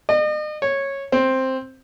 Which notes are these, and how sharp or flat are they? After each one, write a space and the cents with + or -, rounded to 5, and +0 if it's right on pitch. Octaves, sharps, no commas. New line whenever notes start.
D#5 -40
C#5 -10
C4 +5